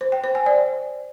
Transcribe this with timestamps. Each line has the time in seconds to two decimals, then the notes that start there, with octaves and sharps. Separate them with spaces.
0.01 C5
0.12 G5
0.24 C5
0.35 G#5
0.46 D5